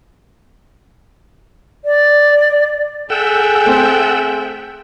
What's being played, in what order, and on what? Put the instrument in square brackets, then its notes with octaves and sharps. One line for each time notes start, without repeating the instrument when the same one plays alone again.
[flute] D5
[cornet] G#4 [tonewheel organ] A4 F#5 E6 [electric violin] E5 G5
[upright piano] A3 C4